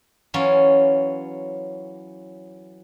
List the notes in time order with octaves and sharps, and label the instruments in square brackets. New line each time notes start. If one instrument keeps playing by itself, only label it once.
[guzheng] E3 F#3 C#4 F4